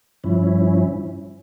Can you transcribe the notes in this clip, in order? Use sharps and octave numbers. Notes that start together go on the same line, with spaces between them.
G2 F3 C#4 E4